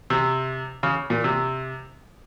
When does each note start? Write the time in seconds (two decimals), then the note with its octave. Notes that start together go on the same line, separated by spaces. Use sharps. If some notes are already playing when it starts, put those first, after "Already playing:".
0.10 C3
0.83 C#3
1.10 A#2
1.24 C3